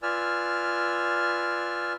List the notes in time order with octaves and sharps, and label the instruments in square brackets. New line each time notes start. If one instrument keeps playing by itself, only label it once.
[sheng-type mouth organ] F4 B4 D5 G#5 E6 F6